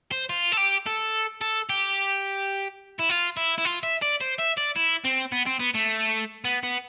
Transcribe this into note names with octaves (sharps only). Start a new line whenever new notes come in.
C5
F4
A4
G4
A4
A4
G4
E4
F4
E4
E4
F4
E5
D5
C5
E5
D5
E4
C4
B3
C4
B3
A3
B3
B3